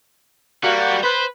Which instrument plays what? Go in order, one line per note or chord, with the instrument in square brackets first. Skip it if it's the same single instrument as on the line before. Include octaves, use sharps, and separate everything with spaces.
[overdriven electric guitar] G3 [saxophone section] A#3 F#4
[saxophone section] B4 [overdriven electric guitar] C5